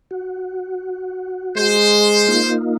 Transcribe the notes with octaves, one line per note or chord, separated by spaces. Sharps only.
F#4
G#3 C5
A#3 D#4 F4